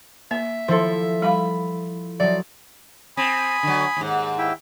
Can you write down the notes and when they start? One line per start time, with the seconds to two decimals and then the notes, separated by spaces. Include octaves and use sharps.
0.31 A#3 E5
0.68 D#3 F3 E4 A4 C5 C6
1.22 G3 F5 B5
2.20 F3 F#3 D5 E5
3.17 C4 G#5 B5 D#6
3.63 D3 F#3
3.97 D#2 G#2
4.38 E4 E5 G5